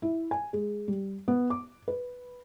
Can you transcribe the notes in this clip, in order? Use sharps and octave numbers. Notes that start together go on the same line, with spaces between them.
E4
G#5
G#3
G3
B3
D6
B4